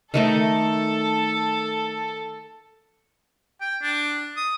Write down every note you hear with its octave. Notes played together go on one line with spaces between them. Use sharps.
D#3 A3 D#4 A4
G5
D4
D#6